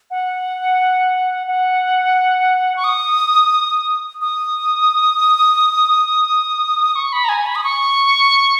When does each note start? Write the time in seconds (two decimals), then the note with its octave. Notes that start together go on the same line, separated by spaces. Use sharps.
0.11 F#5
1.47 F#5
2.76 C#6
2.84 D#6
4.21 D#6
6.96 C#6
7.13 B5
7.25 A#5
7.29 G#5
7.46 B5
7.55 D#6
7.64 C#6